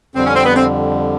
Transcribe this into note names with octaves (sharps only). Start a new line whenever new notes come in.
F2 D3 G3 C4
C#4
C4
B3
C4